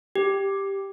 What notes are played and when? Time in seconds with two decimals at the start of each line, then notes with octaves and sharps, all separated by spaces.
0.15 G4